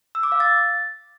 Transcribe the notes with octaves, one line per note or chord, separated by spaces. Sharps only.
E6
D6
F5
A6